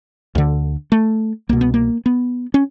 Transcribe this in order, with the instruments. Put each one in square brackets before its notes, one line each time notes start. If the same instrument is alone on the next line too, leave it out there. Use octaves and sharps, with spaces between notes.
[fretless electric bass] D2 D3
A3
C2 B2 A#3
B3
A#3
B3
C#4